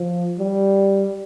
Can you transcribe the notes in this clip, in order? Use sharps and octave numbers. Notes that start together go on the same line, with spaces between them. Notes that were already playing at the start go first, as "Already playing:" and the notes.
Already playing: F3
G3